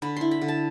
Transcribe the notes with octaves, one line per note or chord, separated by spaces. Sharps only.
D3 B5
E4 C6
B5
D3
A5